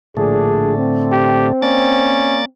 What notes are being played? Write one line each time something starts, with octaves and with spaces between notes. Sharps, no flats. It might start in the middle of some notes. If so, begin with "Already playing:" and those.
A#1 A2 D3 A3 D4 G#4
C4
G4
A#3 C#4 D5 A6